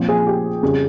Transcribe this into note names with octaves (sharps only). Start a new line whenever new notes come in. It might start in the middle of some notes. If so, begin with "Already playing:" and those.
Already playing: A#2 F3 C4
G#4
G4
F2 C#3 G3